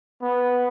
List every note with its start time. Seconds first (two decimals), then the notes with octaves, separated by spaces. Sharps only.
0.22 B3